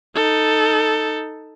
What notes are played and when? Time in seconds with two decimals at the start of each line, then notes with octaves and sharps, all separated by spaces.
0.16 D#4 A4